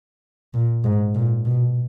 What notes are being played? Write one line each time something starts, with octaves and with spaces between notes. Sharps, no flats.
A#2
G#2
A#2
B2